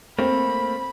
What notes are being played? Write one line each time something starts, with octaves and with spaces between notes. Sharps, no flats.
A3 A#3 C4 B5